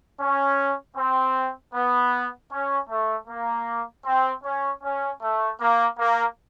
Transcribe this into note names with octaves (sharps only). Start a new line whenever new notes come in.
C#4
C4
B3
C#4
A3
A#3
C4
C#4
C#4
A3
A#3
A#3